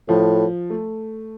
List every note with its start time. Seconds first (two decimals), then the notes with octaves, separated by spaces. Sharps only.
0.09 A2 F3
0.70 A3